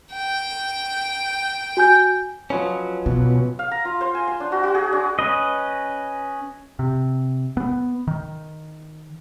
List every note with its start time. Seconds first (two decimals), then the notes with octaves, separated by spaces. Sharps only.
0.13 G5
1.77 F#4 G#5 G6
2.50 F3 F#3 C#4 B4 D#5
3.06 B2 F4
3.59 F5
3.71 A#5
3.85 F4
4.01 C5
4.15 G#5
4.28 C6
4.40 D4
4.52 F#4
4.63 F#4
4.75 G#4
4.92 D4
5.19 C#4 B4 D#5
6.79 C3
7.57 B3
8.07 D#3